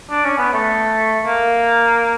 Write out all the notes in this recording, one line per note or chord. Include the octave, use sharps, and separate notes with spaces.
D4
C#4
B3
A3
A#3